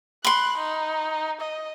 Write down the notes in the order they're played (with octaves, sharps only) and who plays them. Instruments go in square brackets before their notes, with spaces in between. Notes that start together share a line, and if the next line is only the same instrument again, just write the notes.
[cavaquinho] B5 C6 [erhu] F#6
[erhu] D#4
D#5